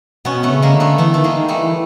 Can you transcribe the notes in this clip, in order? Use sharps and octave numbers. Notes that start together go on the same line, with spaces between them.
B2 B3 C#4
A3 B3
C#3
G#3 A#3
D3
A3 B3
E3 A3 B3
D#3 A3
G#3 A#3
D#3
G3 A3
E3